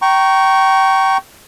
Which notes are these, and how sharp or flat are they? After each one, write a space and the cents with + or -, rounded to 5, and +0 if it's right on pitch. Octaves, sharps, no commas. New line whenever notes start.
G5 -25 A#5 +0 C#6 +0